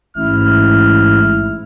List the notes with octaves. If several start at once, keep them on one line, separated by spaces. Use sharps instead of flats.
A1 G#2 E4 F6